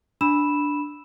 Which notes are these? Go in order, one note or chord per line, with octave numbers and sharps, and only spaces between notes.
D4 B5 E6 E7